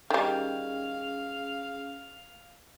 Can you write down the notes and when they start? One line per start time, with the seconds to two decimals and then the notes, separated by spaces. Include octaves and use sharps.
0.10 D#3 G3 C#4 G#4 F5